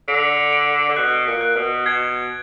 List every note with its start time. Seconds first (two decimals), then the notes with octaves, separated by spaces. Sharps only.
0.08 D3 D7
0.53 D7
0.89 D3
0.97 B2 F#6
1.27 A#2
1.41 F#6
1.56 B2
1.86 B2 G#6